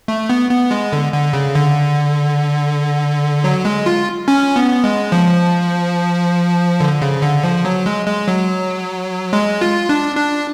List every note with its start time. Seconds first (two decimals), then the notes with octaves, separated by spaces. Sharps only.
0.08 A3
0.30 B3
0.51 B3
0.71 G#3
0.93 D3
1.12 D3
1.33 C#3
1.55 D3
3.44 F#3
3.65 G#3
3.86 F4
4.28 C#4
4.56 B3
4.84 G#3
5.12 F3
6.81 D3
7.02 C#3
7.22 D3
7.44 F3
7.65 F#3
7.86 G#3
8.07 G#3
8.28 F#3
9.33 G#3
9.61 F4
9.89 D4
10.16 D4